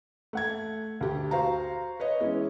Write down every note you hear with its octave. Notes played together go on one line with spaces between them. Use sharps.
A3 F#5 G#6
D2 G4
F#4 C5 F5 A#5
B4 C#5 D#5
E3 G#3 B3 C#4 E4